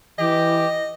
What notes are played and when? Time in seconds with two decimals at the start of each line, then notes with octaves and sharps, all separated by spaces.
0.19 E3 G4 D#5